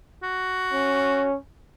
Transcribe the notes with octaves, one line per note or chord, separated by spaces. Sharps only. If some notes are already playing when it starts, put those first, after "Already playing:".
F#4
C#4